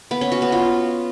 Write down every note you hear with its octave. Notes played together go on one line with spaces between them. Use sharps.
B3
C#4
F#4
B3
F4